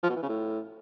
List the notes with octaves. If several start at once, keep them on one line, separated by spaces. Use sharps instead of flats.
F3
B2
E3
C#3
A2